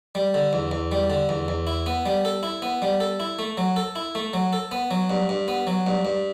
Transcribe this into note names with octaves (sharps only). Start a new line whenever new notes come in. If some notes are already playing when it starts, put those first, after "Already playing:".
G3
D3
E2
E2
G3
D3
E2
E2
E4
B3
G3
A4
E4
B3
G3
A4
E4
A3
F#3
A4
E4
A3
F#3
A4
B3
F#3
G2
G2
B3
F#3
G2
G2